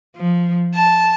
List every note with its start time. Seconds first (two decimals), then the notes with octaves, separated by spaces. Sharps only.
0.16 F3
0.74 A5